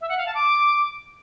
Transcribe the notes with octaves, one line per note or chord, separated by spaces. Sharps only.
E5
F#5
F5
A5
D6